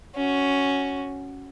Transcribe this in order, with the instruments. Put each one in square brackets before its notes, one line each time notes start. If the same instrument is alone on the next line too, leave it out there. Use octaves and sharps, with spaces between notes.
[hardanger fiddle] C#4 F#4